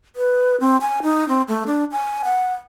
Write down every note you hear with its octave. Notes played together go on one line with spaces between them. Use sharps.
B4
C4
G#5
D#4
C4
A3
D4
G#5
F#5